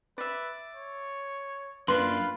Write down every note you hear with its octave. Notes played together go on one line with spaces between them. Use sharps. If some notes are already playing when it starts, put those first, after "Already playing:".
B4 D5 E5
C#5
F#2 A#3 D4 F4 B4 C6